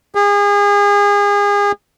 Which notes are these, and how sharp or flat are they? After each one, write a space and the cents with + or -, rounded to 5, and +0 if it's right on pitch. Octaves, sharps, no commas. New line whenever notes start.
G#4 -35